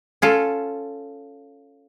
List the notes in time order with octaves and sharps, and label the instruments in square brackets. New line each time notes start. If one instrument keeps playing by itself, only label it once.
[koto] C#4 F4 A4